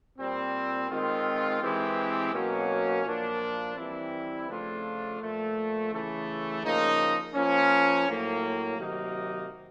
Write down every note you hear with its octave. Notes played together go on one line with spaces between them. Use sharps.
A#2 G3 C4
D#3 G#3 C4 F4
E3 G#3 C4 E4 G4
B2 F#3 A#3 C#4
A#2 F3 A#3 D4
E3 G3 C4 E4
C#3 F3 A3 D4 F4
A#2 F3 A3
C#3 E3 A3
C#3 F3 A#3 D#4
F3 A#3 C#4
A2 F#3 A#3
C3 D#3 F#3 A#3 D#4